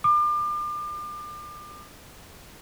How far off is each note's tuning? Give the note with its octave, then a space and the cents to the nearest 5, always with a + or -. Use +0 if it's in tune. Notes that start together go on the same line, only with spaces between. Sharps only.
D6 +35